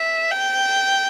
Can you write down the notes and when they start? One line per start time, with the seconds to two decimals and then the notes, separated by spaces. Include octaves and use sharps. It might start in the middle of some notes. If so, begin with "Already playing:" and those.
Already playing: E5
0.31 G5